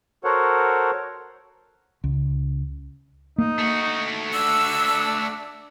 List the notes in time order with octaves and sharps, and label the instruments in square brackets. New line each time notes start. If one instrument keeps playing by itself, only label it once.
[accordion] F#4 A4 A#4 C5 C#5 F#5
[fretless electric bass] C#2
[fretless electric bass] A#3 [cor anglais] D#4
[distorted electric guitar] A3 F#4
[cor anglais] D4 [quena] E6